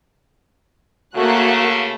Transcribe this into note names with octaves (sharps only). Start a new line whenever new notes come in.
C#3 A3 A#3 F#4 F#6